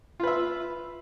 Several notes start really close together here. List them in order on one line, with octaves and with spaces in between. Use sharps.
F4 B4 E5